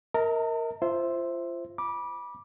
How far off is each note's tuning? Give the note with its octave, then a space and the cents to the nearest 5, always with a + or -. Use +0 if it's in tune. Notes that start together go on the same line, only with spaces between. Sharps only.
A#4 +0 D#5 +45 A5 +45
F4 -25 C5 +0 E5 +0
B5 -25 D6 +0